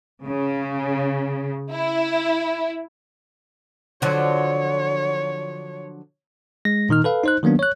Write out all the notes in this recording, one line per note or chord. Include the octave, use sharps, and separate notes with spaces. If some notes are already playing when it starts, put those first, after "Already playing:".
C#3
E4
D3 F3 F#3 C#5
G#3 A#6
A#2 D#3 D#4 F6
A4 B4 F5
D#4 C5 F#6
D#3 F#3 A#3 B3 D4
C#5 F#6